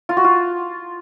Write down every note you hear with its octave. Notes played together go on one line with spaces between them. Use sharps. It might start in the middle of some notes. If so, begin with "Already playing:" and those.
F4
F#4
F4